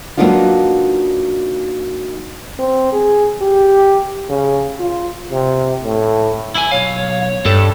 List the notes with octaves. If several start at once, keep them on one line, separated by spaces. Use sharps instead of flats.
F#3 A#3 B3 D4 D#4 F4
C4
G#4
G4
C#3
F4
C3
A2
E4 G#5
B1 C#5 F5
G2 G3 A4